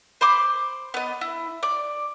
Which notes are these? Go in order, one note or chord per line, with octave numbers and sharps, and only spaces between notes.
C5 B5 C6 D6
B3 D#5
E4
D5